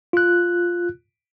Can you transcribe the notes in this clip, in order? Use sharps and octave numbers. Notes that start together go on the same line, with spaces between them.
F4 F#6